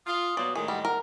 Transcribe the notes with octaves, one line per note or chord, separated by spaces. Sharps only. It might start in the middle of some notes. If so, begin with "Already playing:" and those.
F4 D#6
B2 F#3 D5
A2 D#3 G#3 G#4 A#4
G3 F#5
A#4 F#5